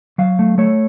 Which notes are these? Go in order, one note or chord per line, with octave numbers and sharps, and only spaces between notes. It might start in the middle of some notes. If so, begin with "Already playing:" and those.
F#3 F5
A3
A3 C#5